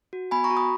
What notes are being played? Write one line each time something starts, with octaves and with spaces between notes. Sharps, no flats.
F#4
B3 G#5 B5
A#5 C#6
F#4
B5 D#6